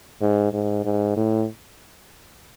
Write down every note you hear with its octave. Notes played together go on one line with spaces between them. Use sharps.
G#2
G#2
G#2
A2